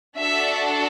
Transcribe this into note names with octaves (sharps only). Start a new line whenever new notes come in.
D4 F#4 A4 E5